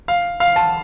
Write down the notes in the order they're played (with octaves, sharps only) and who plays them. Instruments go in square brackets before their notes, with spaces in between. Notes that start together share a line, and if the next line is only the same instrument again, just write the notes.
[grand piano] F5
F5
A5